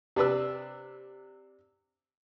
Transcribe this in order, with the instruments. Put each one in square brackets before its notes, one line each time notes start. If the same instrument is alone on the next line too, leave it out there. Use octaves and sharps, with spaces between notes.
[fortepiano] C3 D4 B4 E6